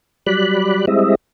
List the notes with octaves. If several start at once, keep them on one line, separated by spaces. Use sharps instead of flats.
F#3 G3 D5 B5 F#6
G3 G#3 C4 E4 D#5 E5